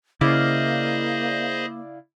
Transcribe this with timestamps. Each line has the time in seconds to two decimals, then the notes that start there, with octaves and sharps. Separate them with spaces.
0.21 C#3 A#3 E4 G#4 C5 D5 D#5 F5